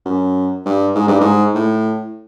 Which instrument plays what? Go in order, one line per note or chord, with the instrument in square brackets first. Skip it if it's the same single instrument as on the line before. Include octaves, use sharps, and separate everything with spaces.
[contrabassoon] F#2
G2
G#2
G2
G#2
A2